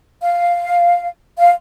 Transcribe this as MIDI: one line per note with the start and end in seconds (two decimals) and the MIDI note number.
0.21 1.07 77
1.39 1.51 77